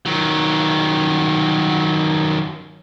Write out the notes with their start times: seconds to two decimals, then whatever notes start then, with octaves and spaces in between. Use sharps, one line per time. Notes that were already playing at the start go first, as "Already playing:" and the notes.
0.06 D#3 F#3